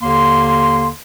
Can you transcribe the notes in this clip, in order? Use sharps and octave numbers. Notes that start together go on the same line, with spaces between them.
D#2 D3 A#3 C6